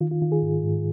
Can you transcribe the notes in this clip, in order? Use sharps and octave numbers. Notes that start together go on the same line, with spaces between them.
D#3 F4
F4
D#3 F4
G#4
G#2
G#2